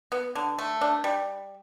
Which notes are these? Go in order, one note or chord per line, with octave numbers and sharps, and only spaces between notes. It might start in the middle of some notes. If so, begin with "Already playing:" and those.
B3
D3
A3
D4
G3